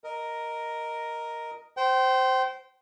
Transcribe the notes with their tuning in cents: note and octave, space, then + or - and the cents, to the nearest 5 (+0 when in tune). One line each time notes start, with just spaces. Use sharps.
A#4 +0 D#5 +0
C5 +0 G5 -30